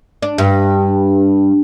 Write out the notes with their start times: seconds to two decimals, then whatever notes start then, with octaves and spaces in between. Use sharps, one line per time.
0.22 D4
0.38 G2